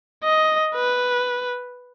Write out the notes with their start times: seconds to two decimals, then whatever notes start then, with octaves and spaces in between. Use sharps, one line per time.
0.24 D#5
0.75 B4